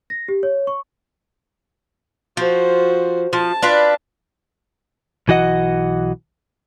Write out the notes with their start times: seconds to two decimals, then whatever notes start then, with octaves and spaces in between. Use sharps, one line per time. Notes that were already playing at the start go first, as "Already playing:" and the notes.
0.10 A#6
0.28 G4
0.43 C#5
0.67 C#6
2.37 F3 F#4 C5
3.33 F3 A5
3.62 D4 F4 B4
5.28 B1 E3 F#4 D#5 F#5